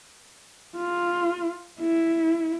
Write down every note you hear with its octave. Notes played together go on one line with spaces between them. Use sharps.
F4
E4